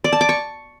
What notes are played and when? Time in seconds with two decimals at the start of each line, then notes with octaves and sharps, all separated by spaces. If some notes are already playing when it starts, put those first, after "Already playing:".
0.04 D5
0.13 A5
0.21 D6
0.29 C#6